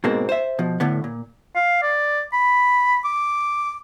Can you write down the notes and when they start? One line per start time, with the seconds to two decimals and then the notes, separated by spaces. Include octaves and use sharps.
0.04 G#2 B2 G#3 A#3 C4
0.29 C5 E5
0.59 B2 F3
0.80 A2 D3 B3
1.04 A#2
1.55 F5
1.82 D5
2.33 B5
3.05 D6